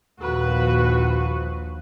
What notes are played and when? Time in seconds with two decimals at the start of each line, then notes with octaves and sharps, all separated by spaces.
0.20 A#1 D#2 F3 F#4 B4